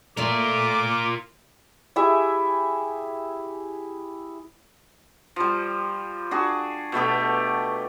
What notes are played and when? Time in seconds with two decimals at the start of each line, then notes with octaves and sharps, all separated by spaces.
0.17 A3 F4 A#4 D5 D6
1.96 E4 G4 G#4 E5
5.36 F3 G3
6.31 D4 F#4 G#4
6.92 B2 A3 B3 G4